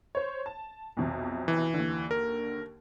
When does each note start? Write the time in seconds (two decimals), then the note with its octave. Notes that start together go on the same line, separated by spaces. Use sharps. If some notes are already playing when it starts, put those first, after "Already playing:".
0.15 C5 C#5
0.46 A5
0.97 B1 F2 C3
1.48 E3
1.74 D#2 D3
2.11 A#4